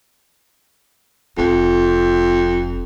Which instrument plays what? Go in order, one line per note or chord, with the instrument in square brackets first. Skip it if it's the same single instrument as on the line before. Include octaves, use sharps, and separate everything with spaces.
[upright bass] F1 [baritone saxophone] F2